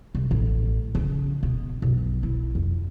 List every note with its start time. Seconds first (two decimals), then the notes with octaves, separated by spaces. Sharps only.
0.15 C2
0.31 A1
0.95 C#3
1.43 B2
1.82 B1
2.23 E4
2.55 F2